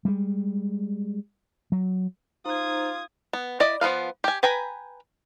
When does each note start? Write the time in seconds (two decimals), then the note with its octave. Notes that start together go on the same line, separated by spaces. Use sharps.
0.05 G3 G#3
1.72 F#3
2.45 D#4 F4 C5 A#5 D#6 G#6
3.33 B3
3.60 E4 D5 D#5
3.81 F3 B3 B4 F5
4.24 G4 G#5
4.43 B4 G5 G#5 A#5 B5